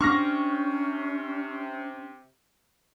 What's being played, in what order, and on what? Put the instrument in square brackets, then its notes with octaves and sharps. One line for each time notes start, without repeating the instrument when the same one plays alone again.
[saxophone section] C3 [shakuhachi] C#4 [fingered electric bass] D4 [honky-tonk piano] C#6 F6 A#6